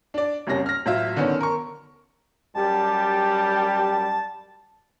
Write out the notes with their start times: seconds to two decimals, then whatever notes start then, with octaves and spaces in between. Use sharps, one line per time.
0.14 D4 D5
0.47 F#1 C2 C3 C#4 A#6
0.66 F6 A#6
0.86 A1 F#3 F4 E5
1.16 D3 D#3 B3 C#4
1.41 A#4 C#6
2.55 F#2 G3 G4 A5